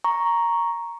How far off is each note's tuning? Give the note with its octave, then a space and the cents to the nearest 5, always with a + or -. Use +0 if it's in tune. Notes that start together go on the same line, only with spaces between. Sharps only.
A#5 +0 C#6 +0